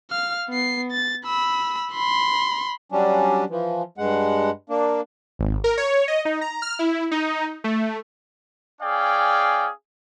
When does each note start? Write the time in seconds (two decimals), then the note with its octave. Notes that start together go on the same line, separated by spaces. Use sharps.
0.11 F5 F6
0.49 B3 C7
0.91 A6
1.25 B5 E6
1.93 B5 C6
2.92 F#3 G3 C#4 D4
3.50 E3 F3
3.98 G2 G#3 F#5
4.70 A#3 D4
5.39 G#1
5.64 A#4
5.77 C#5
6.08 D#5
6.25 D#4
6.41 A#5
6.62 F6
6.79 E4
7.11 D#4
7.64 A3
8.82 C#4 G#4 D5 F5 G5